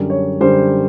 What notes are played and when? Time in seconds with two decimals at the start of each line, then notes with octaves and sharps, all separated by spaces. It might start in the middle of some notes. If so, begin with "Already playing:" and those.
Already playing: F#2 D3 G3
0.10 C#5
0.41 F#2 D3 G3 C5